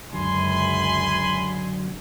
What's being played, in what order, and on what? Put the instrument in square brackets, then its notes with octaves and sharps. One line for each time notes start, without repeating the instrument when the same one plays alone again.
[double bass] C#2 F#2 [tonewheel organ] D3 F#3 [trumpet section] G#5 B5 C6